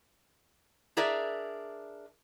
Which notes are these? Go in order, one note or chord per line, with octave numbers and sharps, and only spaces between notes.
D4 G#4 A#4 D5 E5